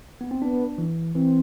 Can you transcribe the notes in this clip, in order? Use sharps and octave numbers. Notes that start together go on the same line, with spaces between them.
B3
C4
B3 D4
E3
E3 C4